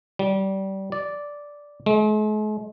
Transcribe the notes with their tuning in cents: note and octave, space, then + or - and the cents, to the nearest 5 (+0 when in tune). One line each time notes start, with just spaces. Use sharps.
G3 -25
D5 -5
G#3 +45